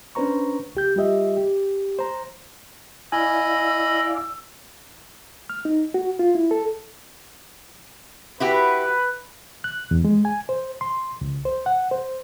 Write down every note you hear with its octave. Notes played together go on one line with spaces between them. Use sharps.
C#4 D4 B4 C5 A#5 C#6
C#2 G4 G6
G3 F4 G4 D#5 E5
G4
C5 A#5
E4 D5 D#5 F5 G#5 B5 E6
F6
D#4
F#4
F4
E4
A4
E4 F#4 G4 B4
F#6
E2
G#3
G#5
C5
C6
C#2
C5
F#5
C5